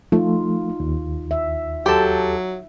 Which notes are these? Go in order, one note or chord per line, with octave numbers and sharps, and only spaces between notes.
F3 A3 D#4 F4
D#2
E5
F#3 G4 A4